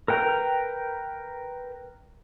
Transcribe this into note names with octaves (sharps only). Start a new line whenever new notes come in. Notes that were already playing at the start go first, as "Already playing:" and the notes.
A#4 B4 G5 A#5